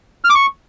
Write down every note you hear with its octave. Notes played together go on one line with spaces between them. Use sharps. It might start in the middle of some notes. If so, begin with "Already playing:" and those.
F6
D6
C#6